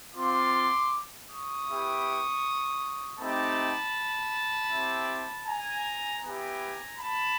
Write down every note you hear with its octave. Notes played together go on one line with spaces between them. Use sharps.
C4 F4 C6 D6
C#6 D#6
B3 E4 G4
A3 C4 D#4 G4 A5 B5
C4 E4 G4
G#5 A#5
B3 E4 G4 G#5 A#5
A5 B5